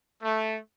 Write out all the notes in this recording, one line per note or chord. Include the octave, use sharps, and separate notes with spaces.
A3